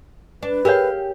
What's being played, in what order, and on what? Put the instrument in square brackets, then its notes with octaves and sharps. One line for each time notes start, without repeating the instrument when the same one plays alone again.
[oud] D4 [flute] B4
[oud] G4 G#4 F5 [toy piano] A#4 C#5